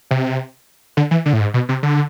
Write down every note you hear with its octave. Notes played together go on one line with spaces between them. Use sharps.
C3
D3
E3
D3
A2
G#2
B2
C3
D3